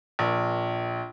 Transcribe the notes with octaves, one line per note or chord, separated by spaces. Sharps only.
A#1